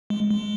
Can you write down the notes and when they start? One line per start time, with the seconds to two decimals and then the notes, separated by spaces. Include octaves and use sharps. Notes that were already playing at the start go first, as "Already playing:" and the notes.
0.10 G#3
0.31 G#3